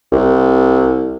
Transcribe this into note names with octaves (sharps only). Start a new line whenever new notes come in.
C2